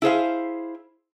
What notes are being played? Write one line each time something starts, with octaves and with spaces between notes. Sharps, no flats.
E4 G#4 C5 F5